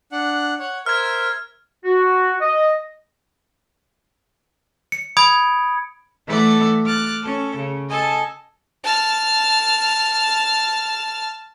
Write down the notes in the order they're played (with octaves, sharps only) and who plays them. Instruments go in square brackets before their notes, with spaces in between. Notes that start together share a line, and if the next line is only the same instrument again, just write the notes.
[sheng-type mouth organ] D4 F#5
C#5 F#5
[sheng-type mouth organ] A#4 C5 E5 [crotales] F6 G#6
[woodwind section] F#4
D#5
[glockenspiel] C#7
B5 D#6 G#6 D7
[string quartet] E3 A3 A4 D5 F#5
D6 F6 F#6 A6
C#4 A4
C#3
A4 D#5 G#5 A5
[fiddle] A5 F6